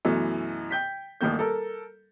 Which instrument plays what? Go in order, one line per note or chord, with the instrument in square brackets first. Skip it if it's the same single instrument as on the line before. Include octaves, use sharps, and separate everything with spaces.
[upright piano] F#2 B2 E3 A3
G5 G6 B6
D#1 A1 G2 D#3 A#3 G6
A4 A#4